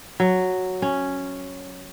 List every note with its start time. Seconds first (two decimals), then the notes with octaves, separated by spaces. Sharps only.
0.20 F#3
0.82 C#4